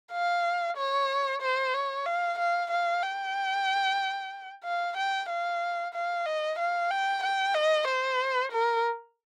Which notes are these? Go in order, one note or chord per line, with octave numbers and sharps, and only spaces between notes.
F5
C#5
C5
C#5
F5
F5
F5
G5
F5
G5
F5
F5
D#5
F5
G5
G5
D#5
C5
A#4